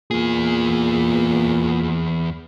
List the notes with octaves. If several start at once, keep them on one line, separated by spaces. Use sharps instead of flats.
E2 A#2 G#4